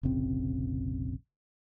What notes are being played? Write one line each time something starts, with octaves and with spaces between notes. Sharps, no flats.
F1 A#1 C#3 C4